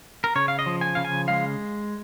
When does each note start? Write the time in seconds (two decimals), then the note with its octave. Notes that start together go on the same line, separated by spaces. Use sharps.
0.24 A#4
0.36 C#3 C#5
0.48 F5
0.59 D#5
0.66 F3
0.81 G#5
0.95 C#3 F5
1.05 G#5
1.28 G#3 F5